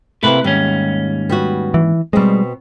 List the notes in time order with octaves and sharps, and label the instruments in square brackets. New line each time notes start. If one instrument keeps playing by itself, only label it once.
[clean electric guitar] C3 E4 B4 [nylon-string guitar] A3 A#3 C4
[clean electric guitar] D#2 G#2 C#4 [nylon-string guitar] G3
[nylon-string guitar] G3 B3 F#4
[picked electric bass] E3
[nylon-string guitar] B2 C4 [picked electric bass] G3 G#3